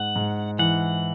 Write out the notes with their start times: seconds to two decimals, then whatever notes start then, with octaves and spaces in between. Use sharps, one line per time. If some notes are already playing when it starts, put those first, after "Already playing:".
Already playing: G#2 F#5
0.16 G#2
0.59 E3 F#5